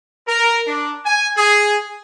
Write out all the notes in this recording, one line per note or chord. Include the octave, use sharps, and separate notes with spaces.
A#4
D4
G#5
G#4